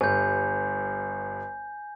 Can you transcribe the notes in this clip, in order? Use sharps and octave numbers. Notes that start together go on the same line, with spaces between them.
G1 G2 G#5 G6